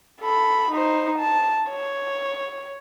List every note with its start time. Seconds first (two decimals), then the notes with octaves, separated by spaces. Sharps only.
0.21 A4 B5
0.71 D#4 C5
1.18 A5
1.70 C#5